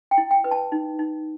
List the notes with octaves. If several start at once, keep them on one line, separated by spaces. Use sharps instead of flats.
G5
E4
G5
B4
A5
D#4
D#4